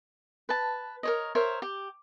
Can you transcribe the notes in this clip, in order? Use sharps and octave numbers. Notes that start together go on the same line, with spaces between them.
B4 A5
A#4 C#5 D#5
A#4 C5 C#5 E5
G4